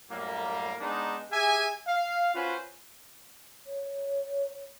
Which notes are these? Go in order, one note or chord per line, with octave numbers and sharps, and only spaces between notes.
F#2 A2 G3 A#3
G#3 B3 D4 D#4
G4 G#4 E5 G#5
F5
C#4 F4 F#4 B4 C5
C#5